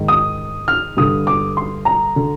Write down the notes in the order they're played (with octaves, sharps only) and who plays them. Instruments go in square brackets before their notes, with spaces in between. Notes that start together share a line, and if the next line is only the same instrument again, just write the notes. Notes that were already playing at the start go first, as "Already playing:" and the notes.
Already playing: [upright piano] G#2 D#3
D#6
F6
G2 D3 D#6
D6
C6
A#5
D3